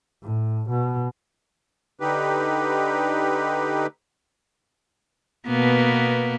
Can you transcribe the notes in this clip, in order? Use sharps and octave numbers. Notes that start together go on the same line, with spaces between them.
A2
B2
D3 D#4 G4 B4
B2 A#3 B3